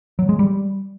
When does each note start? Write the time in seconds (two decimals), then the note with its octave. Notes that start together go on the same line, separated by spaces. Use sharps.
0.19 F#3
0.29 G#3
0.39 G3